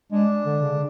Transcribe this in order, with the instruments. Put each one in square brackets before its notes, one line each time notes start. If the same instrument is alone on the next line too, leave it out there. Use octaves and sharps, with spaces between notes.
[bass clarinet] G#3 [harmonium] D4
[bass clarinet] D3
C#3